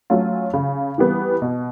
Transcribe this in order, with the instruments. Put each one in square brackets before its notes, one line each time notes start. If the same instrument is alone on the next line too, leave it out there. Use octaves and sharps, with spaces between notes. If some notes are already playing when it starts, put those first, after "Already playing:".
[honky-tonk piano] F#3 A3 C#4 F4
C#3
E3 G3 B3
B2